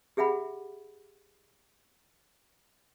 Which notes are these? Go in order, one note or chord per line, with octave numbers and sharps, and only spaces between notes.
G4 G#4 E5 F#5 B5